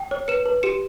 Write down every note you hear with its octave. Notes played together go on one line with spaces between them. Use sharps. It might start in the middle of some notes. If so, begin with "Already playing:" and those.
Already playing: G5
C#5
B4 C#7 E7
B4
G4 C#7 E7